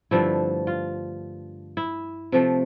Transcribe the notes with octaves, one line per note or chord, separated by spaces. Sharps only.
G2 D3 F3 A3 E4
F4
E4
C3 F3 A3